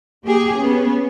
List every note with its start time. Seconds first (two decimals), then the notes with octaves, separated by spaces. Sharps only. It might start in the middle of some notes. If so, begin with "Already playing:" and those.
0.25 A#3 G4 G#4
0.57 B3 C#4